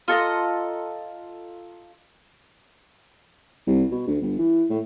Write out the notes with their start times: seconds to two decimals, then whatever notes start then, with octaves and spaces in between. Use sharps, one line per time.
0.08 F4 A4 D#5 A#5
3.67 C2
3.92 B2
4.07 D2
4.22 G1
4.39 E3
4.70 A2